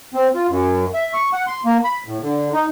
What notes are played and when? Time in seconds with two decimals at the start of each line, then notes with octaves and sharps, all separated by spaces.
0.14 C4
0.35 F4
0.49 F#2
0.94 E5
1.13 C#6
1.33 F#5
1.47 C6
1.65 A#3
1.84 B5
2.06 A2
2.22 D3
2.53 D#4